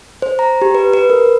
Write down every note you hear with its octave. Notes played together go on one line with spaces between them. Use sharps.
C5
A#5
G4
B4
B4
A#4